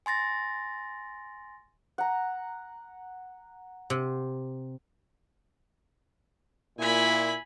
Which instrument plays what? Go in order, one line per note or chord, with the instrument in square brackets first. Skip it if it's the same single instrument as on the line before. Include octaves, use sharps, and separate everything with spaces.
[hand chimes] G#5 C6 A6 A#6
[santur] F#5 A#5
[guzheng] C3
[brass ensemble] A#2 E4 [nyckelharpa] G#5 B5